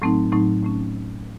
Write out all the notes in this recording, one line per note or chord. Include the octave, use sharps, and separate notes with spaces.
A2 F#3 A3 C4 D#4
A2 F#3 A3 C4 D#4
A2 A3 C#4